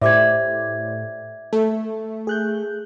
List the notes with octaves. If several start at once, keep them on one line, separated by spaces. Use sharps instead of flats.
A2 G4 C5 D5 E5 D6 G#6
A3 A4
G#4 F#6 G6